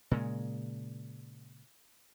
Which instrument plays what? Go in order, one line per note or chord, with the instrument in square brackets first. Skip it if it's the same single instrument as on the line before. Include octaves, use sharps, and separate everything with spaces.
[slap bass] A#2 C#3 G#3